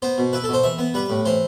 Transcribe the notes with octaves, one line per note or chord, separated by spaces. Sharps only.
B3 C5
B2
E4 B4
A4
B2 C5
E3 E5
B3
G3 B4
A2
E3 C5